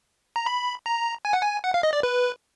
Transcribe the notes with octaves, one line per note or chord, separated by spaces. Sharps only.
A#5
B5
A#5
G#5
F#5
G#5
F#5
F5
D#5
D5
B4